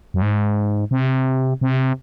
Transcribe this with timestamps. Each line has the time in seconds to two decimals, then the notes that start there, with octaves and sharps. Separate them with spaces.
0.14 F#2
0.22 G#2
0.91 C3
1.61 C3